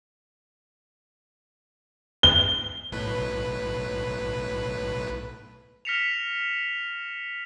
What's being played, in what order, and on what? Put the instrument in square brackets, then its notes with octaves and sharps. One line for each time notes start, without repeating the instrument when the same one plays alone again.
[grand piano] G7
[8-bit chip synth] B1 A2 B4
[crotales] F6 A#6 B6 C#7 E7 F7